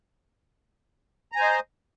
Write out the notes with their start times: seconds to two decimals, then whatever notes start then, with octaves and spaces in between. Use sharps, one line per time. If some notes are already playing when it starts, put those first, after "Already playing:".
1.32 A#5
1.36 G#5
1.39 C5
1.42 D#5